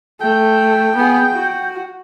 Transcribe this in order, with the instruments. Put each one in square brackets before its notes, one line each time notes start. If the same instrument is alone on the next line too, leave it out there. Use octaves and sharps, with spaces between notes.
[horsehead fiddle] A3 [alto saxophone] G5
[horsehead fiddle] B3 G#4
F#4